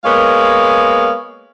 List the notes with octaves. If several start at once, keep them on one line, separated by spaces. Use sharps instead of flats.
G#3 A#3 B3 C#5 F5